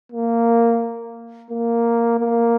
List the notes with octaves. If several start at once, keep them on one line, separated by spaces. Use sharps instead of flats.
A#3
A#3
A#3